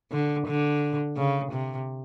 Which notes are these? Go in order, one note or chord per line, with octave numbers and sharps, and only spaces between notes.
D3
D3
C#3
C3